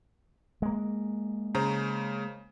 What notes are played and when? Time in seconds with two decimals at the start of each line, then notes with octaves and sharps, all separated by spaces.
0.62 G#3 A#3
1.55 C#3 C5 A#5